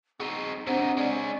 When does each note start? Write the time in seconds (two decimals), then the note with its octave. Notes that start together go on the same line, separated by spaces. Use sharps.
0.20 C4 D#4 F#4 G#4
0.67 C3 C4 D4 D#4 C5 F#5
0.97 G#3 C#4 D5